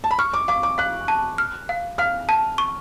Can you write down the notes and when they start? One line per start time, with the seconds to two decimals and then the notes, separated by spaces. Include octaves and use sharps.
0.04 A5
0.11 B5
0.19 C#6 F6
0.34 D6
0.48 F5 D6
0.63 D6
0.78 F5 F#6
1.08 A5
1.38 F6
1.69 F5
1.98 F5 F6
2.29 A5
2.58 C#6